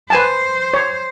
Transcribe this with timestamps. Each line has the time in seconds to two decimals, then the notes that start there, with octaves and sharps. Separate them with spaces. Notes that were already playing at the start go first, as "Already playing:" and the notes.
0.10 B4 C5 G#5 A5
0.74 C#5